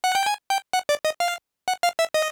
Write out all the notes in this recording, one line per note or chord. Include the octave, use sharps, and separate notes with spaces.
F#5
G5
G#5
G5
F#5
D5
D#5
F5
F#5
F5
E5
D#5